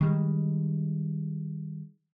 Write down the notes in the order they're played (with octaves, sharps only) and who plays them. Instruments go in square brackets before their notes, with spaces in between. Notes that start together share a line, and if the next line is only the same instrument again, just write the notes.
[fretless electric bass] D#3 G3 G#3